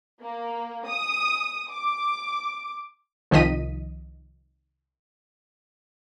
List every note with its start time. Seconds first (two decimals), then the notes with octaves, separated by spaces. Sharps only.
0.22 A#3
0.87 D#6
1.70 D6
3.31 C2 D#3 F3 D#5 B6 D#7